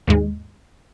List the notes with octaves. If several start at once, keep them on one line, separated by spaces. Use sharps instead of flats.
D#2 G#2 G#3